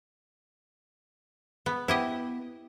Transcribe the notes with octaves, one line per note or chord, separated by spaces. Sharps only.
B3
B3 E4 G4 D#5